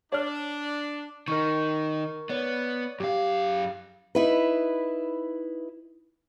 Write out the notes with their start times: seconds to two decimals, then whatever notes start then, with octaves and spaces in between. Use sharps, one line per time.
0.12 D4 C#5 D5 F6
1.28 D#3 D#4 A#4 C#6
2.30 B3 C#5 D5
3.00 F#2 G4 F5
4.15 D#4 E4 B4